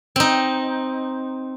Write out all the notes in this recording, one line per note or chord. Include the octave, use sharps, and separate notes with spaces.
C4 D#4